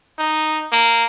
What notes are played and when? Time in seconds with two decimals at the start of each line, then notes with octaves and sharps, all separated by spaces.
0.19 D#4
0.72 A#3